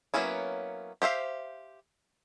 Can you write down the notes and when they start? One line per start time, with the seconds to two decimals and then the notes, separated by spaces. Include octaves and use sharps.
0.14 F#3 A#3 B3 C#4 E4
1.02 G4 C5 E5 F5